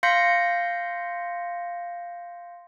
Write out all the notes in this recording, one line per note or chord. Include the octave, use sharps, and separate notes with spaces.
F5 C6 G6 A#6 B6 C#7